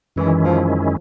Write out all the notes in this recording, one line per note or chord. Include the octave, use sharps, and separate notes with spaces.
F#2 D#3 E3 G#3 C#4 E4
F3